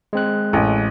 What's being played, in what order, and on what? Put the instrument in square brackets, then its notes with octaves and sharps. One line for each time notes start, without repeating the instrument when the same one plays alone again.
[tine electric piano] G#3 C4 F#6
[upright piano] A1